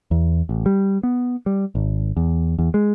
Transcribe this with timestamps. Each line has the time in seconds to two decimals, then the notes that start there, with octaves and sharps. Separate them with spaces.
0.11 E2
0.49 A1
0.66 G3
1.03 B3
1.46 G3
1.75 G#1
2.17 E2
2.59 E2
2.74 G#3